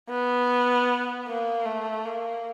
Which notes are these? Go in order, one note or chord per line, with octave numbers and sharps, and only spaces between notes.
B3
A#3
A3
A#3